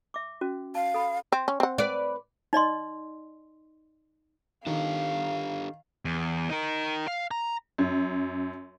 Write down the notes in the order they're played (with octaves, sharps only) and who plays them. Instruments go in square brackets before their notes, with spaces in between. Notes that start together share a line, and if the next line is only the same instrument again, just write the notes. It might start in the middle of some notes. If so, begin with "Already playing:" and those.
[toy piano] E5 D6
C#4 F#4
[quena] F5 [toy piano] A5
[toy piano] A4 B5
[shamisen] C4
C#4
C4 F#5
[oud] B4 D5
[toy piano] D#4 D5 D#5 C6
[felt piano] D#3 [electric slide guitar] D4 G4 A4 [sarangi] F5
[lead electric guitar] E2
D#4 A#4
F5
A#5
[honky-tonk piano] F#2